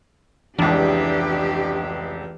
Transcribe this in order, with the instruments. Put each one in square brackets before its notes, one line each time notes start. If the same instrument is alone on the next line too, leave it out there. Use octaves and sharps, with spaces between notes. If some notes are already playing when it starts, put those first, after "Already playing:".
[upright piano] F1 C#2 [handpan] E3 [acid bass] D4 [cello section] G4